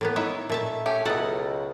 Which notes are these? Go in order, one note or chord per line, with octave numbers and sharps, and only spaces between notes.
A2 A#3 B3
D#4 E4 C#5 E5
A#2 A3 E5 A5
A3 C#4 G4 G#5
C#2 B2 F#3 E4 A4 D#5 F#5